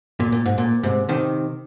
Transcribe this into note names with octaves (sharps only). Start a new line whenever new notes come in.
A#2
A#2
G#2
A#2
G#2 C3
C3 D#3